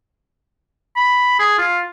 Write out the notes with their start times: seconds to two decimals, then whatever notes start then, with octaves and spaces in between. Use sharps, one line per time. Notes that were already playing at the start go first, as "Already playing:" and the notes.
0.96 B5
1.39 G#4
1.58 F4